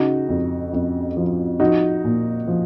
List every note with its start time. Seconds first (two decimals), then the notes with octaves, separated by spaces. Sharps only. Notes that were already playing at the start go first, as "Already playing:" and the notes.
Already playing: C#3 D#4 F#4
0.29 F2
0.73 F2
1.17 F3
1.60 F3 D#4 F#4
2.05 A#2
2.47 F3